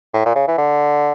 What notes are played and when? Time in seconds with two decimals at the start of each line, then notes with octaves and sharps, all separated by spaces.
0.14 A2
0.26 A#2
0.35 C#3
0.48 E3
0.58 D3